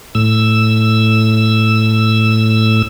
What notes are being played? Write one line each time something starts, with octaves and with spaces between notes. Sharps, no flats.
A2 E6